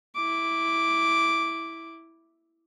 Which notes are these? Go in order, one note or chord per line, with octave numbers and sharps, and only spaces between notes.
E4 D6